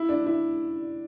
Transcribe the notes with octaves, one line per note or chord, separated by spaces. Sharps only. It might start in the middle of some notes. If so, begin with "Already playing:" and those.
Already playing: E4
D4
E4